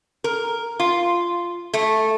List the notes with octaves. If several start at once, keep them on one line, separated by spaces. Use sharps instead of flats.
A#4
F4
A3